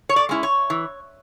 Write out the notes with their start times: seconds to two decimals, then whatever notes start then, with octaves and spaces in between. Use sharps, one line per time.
0.09 C#5
0.16 D5
0.29 G#3 C#4 E4
0.43 C#5
0.70 E3